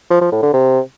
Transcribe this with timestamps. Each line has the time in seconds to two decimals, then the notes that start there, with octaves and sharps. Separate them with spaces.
0.10 F3
0.21 F3
0.32 A2
0.43 D3
0.53 C3